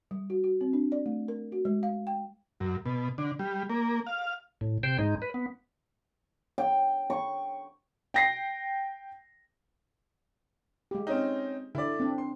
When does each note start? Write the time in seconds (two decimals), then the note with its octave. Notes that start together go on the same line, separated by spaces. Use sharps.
0.11 G3
0.30 F#4
0.44 F#4
0.61 C4
0.73 D4
0.92 D5
1.06 A3
1.28 A#4
1.52 F#4
1.65 G#3
1.83 F5
2.07 G5
2.60 F#2
2.85 B2
3.18 D3
3.39 G3
3.70 A#3
4.06 F5
4.61 A2
4.83 C3 C5 G5
4.98 G#2 G#3 D#4
5.22 B4
5.34 B3
6.58 G5
7.10 C#6
8.14 G5 A#6 C7
10.91 G#3 G4
11.07 C4 C#4 D#4
11.75 D3 E4 D5
12.00 C4 D4
12.18 C6